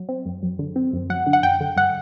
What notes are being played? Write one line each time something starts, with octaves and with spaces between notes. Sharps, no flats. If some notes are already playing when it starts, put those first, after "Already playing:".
Already playing: F#3
C4
F#2
F#2
D3
C4
F#2
F#3 F#5
D3
F#5
F#2 G5
D3
G2 F#5